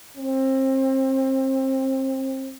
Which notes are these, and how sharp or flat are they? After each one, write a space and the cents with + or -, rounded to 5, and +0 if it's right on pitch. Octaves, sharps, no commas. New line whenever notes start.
C4 +30